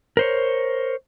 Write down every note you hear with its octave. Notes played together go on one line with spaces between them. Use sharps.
A#4 C5 C#5